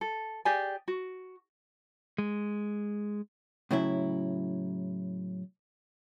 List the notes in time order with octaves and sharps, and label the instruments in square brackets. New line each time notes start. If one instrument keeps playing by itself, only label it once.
[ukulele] A4
G4 G#4 D5 G#5
F#4
[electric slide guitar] G#3
[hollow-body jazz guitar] A2 C#3 F#3 E4